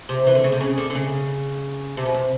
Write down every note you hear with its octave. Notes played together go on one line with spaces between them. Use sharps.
C3
E3
D3
C#3
C3
C#3
D3
D3
C#3
C3
B2
C3